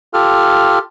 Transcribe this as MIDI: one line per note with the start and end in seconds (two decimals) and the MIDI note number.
0.14 0.79 65
0.14 0.79 67
0.14 0.79 69
0.14 0.79 89